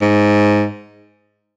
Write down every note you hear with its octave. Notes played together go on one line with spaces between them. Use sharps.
G#2